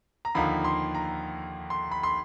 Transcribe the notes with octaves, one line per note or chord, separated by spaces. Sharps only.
A#5
D#2 D3 F3 A#3 D#4 B5
C6
A#5
C6
B5
C6